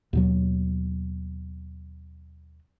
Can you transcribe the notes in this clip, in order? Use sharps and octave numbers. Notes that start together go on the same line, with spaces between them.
D#2 B2 F#3